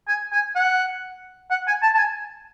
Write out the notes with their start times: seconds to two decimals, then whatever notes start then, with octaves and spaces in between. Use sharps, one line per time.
0.08 G#5
0.32 G#5
0.56 F#5
1.51 F#5
1.67 G#5
1.83 A5
1.95 A5
1.98 G#5